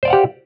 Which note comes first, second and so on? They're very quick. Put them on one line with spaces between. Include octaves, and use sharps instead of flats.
C5 D5 F5 F#5 G4